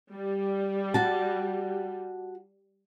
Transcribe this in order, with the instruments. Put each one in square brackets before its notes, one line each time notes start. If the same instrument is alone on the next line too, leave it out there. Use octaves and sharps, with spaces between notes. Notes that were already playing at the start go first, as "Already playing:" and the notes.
[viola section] G3
[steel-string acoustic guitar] F#4 A5